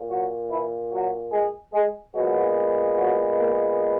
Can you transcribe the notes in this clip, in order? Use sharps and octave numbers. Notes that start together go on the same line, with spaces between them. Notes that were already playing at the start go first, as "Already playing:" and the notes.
Already playing: A#2
F#3 F#4
E3 E4
F#3 F#4
G#3 G#4
G#3 G#4
A#2 F#3 G#3 B3 F#4
F#3 F#4
A#3 A#4